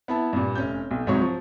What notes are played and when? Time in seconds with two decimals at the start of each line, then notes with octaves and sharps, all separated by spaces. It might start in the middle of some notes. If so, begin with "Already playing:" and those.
0.08 B3 E4 A5
0.33 G2 A#2
0.55 F1 C#4 G6
0.91 B1
1.06 C2 G#2 C3 F#3 C#5 C#6
1.22 F3